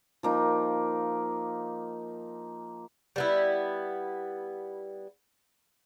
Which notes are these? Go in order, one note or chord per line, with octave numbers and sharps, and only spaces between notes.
F3 A#3 D#4
G3 B3 E4